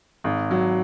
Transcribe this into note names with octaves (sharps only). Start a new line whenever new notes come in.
G#1
F#3